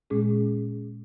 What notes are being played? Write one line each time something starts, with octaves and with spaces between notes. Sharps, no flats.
A#2 G#3 C#4 G#4